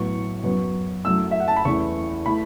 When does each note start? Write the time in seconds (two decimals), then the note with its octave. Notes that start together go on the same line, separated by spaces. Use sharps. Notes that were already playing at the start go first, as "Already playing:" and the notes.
Already playing: A2 F#3 B3 C#6
0.44 F#2 F#3 B3
1.04 F#2 F#3 A3 E4 E6
1.31 E5
1.40 F#5
1.48 A5
1.57 B5
1.65 E2 E3 A3 C#4 E4 C#6
2.26 E3 A3 E4 B5